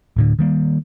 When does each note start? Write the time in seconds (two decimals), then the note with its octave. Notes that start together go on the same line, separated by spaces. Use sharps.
0.16 D1 A2 D3
0.39 D#3 G3 A#3